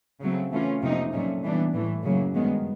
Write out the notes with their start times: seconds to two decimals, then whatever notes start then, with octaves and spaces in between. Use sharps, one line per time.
0.21 C#3 F#3 A3 C4
0.51 E3 A3 C#4 F4
0.82 F2 C3 F3 A#3 D#4
1.12 A#2 F#3 A3 C#4
1.43 E3 G3 B3 D4
1.73 A2 E3 A3
2.03 F#2 C#3 F#3 A#3
2.35 G2 D#3 G#3 B3